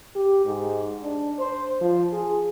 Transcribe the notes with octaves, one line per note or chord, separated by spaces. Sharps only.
G4
G#2
D4
C5
F3
G#4